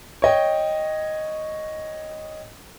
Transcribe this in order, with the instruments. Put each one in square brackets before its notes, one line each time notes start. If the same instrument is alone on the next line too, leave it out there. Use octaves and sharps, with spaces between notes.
[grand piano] C#5 D#5 G5